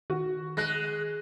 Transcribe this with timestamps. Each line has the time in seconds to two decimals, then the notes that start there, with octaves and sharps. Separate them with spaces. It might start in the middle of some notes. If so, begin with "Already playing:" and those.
0.10 D#3 F#4
0.57 G#3 F#6 A#6